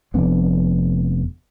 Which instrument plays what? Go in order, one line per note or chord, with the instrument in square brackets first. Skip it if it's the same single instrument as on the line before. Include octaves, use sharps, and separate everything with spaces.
[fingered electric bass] F1 F2 B3 D4